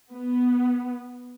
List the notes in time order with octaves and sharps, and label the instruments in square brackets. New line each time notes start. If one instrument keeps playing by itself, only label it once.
[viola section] B3